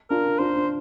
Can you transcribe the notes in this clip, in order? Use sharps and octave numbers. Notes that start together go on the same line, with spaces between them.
D4 F4 A#4
D4 F4 C5
D4